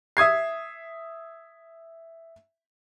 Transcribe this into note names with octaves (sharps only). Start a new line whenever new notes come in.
E5 D#6 G#6 C7